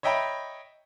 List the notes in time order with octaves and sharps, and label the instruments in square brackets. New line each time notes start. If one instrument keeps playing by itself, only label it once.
[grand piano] C#5 D#5 E5 G5 A#5 B5